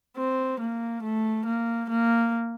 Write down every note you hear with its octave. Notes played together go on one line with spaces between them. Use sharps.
C4
A#3
A3
A#3
A#3